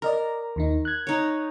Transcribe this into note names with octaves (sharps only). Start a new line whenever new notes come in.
A#4 D5 D#5 A#5
D#2 D#3 D#4
F#6 G#6
D#4 C#5